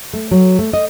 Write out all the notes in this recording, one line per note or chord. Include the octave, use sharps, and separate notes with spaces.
A3
F#3
A3
D#5